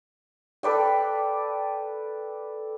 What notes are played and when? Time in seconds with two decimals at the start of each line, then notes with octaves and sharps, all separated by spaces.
0.63 A4 B4 D5 G5